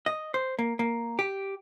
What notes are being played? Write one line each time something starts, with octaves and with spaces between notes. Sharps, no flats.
D#5
C5
A#3
A#3
G4